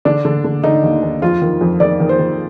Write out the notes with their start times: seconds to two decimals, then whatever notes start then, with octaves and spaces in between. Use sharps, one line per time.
0.05 D3 D4
0.25 D3
0.44 D3
0.63 D3 D#4
0.83 D#2
1.02 D#2
1.22 F2 F4
1.41 D#3
1.61 F2
1.80 D#3 D5
2.00 D#3
2.09 C5
2.19 D#3